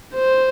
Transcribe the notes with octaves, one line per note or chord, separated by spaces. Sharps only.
C5